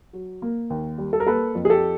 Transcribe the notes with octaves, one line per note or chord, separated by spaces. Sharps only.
F#3
A#3
D#2
G3
A4
A#4
A#3 A4 B4
F2
G#4
G4 A4